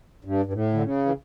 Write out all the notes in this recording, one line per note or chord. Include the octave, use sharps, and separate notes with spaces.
G2
G2
A2
D3
C#3
E3